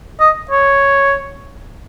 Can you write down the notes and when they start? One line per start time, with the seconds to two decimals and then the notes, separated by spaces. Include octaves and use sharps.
0.20 D#5
0.51 C#5